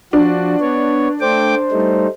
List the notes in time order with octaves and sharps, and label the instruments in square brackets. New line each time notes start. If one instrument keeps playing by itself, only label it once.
[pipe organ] F3 F#4 [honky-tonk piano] D4
[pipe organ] B3 C#5
[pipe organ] A3 G5 D6 [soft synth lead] C5
[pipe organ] G3 A3 D#4